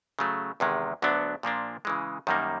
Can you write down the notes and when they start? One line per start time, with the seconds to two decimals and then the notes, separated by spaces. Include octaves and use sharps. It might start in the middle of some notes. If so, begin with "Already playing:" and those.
0.19 C#3 F#3 A3
0.60 E2 C3 D#3 G#3
1.02 D2 D3 F#3 B3 D4
1.43 A#2 F3 A#3 D4
1.85 C#3 E3 G#3
2.27 F#2 D#3 G3 A#3 D#4